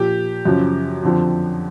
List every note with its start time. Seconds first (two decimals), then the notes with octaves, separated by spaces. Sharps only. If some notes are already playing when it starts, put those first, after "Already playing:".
Already playing: A#2 F3 G4
0.45 F#2 C#3 F3
1.03 F2 D3 F3